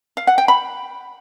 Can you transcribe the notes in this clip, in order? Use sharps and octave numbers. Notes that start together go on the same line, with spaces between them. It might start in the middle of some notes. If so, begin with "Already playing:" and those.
F5
F#5
G5
B5